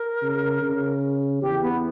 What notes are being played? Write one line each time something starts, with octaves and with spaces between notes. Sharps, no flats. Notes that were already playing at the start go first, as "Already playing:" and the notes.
Already playing: A#4
C#3
C#3
E2 G4
B3